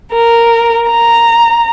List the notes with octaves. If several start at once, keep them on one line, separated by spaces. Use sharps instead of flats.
A#4
A#5